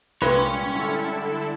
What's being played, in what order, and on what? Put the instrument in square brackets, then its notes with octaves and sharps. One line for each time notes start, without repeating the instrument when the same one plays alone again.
[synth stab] C2 B4 [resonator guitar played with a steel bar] G2 G#3 [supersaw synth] A#2 [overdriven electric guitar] C#4 C#5
[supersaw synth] D3 E4 A4